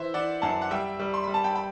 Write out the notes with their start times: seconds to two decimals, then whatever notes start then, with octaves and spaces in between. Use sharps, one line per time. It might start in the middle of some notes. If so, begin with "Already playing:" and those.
Already playing: E3 C5 E5
0.14 E3 D5 F#5
0.42 F#2 F#5 A5
0.62 F#5
0.71 G3 E5 G5
0.99 G3
1.14 C6
1.24 G3 B5
1.34 A5
1.44 G5 B5
1.55 G5 B5